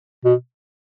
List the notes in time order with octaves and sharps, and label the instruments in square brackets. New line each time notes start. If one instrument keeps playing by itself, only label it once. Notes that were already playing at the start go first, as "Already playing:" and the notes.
[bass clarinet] B2